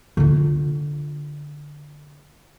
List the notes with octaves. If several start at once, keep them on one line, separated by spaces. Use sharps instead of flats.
D3 F4